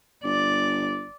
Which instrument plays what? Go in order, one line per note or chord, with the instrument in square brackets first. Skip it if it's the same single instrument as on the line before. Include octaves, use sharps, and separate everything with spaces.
[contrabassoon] G1 [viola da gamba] D5